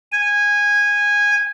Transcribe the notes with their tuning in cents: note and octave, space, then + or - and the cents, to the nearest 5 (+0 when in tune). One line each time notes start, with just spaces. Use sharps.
G#5 -15